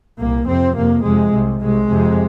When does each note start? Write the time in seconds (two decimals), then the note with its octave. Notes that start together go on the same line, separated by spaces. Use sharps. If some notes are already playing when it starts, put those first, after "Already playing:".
0.18 C2 A#2 A#3
0.46 F2 C3 C4
0.75 F2 C3 A#3
1.03 F2 C3 G#3
1.31 C2 C3
1.60 C2 C3 G#3
1.88 F2 C3